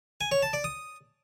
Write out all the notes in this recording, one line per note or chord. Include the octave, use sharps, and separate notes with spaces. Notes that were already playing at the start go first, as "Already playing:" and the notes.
G#5
C#5
A5
D5
D#6